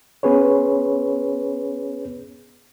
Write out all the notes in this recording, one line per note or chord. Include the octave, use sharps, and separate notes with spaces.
B3 C#4 G#4 B4 C#5